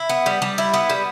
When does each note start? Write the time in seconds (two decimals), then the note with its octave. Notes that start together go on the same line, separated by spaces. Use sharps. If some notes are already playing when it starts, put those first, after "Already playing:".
Already playing: E4
0.09 B3
0.26 G3
0.42 G3
0.58 E4
0.74 B3
0.90 G3